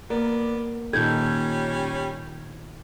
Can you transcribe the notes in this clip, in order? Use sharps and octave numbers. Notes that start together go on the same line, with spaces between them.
A#3 B3 A#4 D5
A#2 D#3 G3 C#4 D#4 A4 G6 G#6